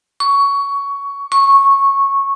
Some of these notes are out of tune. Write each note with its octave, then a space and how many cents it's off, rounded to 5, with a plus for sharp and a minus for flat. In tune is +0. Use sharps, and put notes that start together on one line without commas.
C#6 +15
C#6 -10